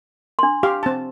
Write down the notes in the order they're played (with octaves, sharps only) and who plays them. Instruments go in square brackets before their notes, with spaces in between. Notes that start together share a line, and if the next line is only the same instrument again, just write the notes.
[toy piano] D4 C6
[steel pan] G4 F5
C4 A5